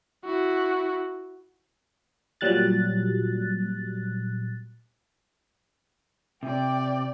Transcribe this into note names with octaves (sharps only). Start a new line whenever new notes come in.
E4 F#4
A#2 F#3 G3 F#6 A6
C3 D5 G5